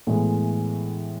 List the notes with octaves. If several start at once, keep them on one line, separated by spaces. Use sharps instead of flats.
A2 E3 G#3 B3